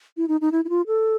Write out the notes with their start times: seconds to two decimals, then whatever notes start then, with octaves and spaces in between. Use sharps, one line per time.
0.17 E4
0.28 D#4
0.41 D#4
0.52 E4
0.65 E4
0.69 F4
0.87 A4